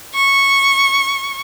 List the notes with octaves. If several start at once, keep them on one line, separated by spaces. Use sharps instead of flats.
C#6